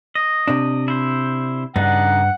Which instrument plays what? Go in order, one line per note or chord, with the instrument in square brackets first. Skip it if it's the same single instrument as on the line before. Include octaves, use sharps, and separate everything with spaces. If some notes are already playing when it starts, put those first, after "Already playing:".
[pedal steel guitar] D#5
[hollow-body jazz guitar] C3 D4
[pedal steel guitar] E4 C5
[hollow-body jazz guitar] G2 [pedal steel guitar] C#3 D4 D#4 [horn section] F#5